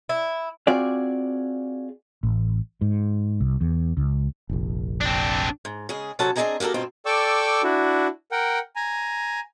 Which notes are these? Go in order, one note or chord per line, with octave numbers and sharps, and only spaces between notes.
E4
C4 F4 F#4 G#4 D5
A1
G#2
C2
E2
C#2
F1 A#1
C4 D4
G#2
C#3 G#3 G#4
C3 F#3 C#4 A4 F#5 A5
C4 D4 G#4 D#5 G#5 A#5
A#3 F#4 G4 A4 A#4
G2 B2 C4 D#4 F4
A4 D5 G5 C#6 D6 E6
D4 E4 F#4
A#4 F#5 G5
G#5 A#5